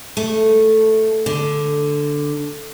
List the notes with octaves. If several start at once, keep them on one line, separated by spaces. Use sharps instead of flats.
A3
D3